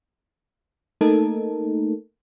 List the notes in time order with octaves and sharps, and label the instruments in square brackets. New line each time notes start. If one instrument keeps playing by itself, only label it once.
[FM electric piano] A3 A#3 D#4 A4 A#4